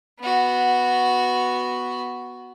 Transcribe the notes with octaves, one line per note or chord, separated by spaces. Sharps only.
B3 F#4